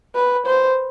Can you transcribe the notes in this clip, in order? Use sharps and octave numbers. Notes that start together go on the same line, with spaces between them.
B4
C5